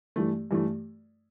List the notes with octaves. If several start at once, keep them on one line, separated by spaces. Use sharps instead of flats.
G2 E3 A3
G2 E3 A3